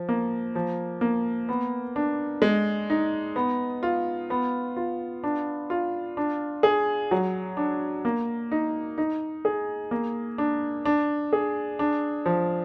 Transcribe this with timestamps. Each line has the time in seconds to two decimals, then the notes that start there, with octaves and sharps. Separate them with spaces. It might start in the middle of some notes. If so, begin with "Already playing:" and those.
Already playing: F3
0.09 A#3
0.55 F3
1.01 A#3
1.49 B3
1.96 D4
2.42 G#3
2.90 D#4
3.36 B3
3.83 F4
4.30 B3
4.77 F4
5.24 D4
5.70 F4
6.17 D4
6.63 G#4
7.11 F#3
7.57 D4
8.05 A#3
8.51 D#4
8.98 D#4
9.45 G#4
9.91 A#3
10.38 D4
10.85 D4
11.33 G#4
11.79 D4
12.26 F3